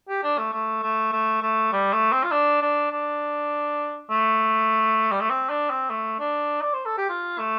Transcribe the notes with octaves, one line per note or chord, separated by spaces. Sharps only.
G4
D4
A3
A3
A3
A3
A3
G3
A3
C4
F4
D4
D4
D4
A3
G3
A3
C4
D4
C4
A3
D4
D5
C5
A4
G4
F4
A3